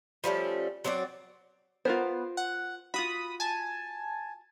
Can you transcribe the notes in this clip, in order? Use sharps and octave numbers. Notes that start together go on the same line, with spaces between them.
F3 G3 A3 C#4
F#3 C4 F#4 D5
B3 F4 A#4 C5
F#5
F4 F#4 B5 D#6
G#5 A5